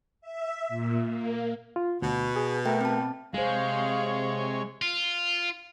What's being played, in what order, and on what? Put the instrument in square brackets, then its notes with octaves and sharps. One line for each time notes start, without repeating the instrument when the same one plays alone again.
[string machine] E5
A#2
A#3
[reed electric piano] F4
[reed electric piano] D2 [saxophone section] B2
[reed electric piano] G#4
[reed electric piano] A3 A#4 E5 [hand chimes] G5
[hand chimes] C4 A5
[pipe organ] C3 C#5 [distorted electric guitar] G#3 [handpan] G#4 C5 [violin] F5
[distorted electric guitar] F4